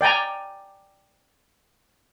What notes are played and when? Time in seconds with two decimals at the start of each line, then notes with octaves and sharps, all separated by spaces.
0.01 D5 G5 G#5 A#5